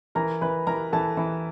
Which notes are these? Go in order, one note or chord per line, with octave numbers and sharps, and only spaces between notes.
E3 A#4 A#5
E3 B4 B5
E3 A#4 A#5
E3 A4 A5
E3